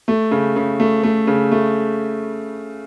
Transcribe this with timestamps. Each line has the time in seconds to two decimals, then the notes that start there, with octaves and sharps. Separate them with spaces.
0.08 A3
0.31 C#3
0.56 C#3
0.80 A3
1.03 A3
1.27 C#3
1.51 A3